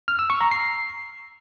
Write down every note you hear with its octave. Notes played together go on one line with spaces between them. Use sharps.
F6
E6
C#6
A#5
C7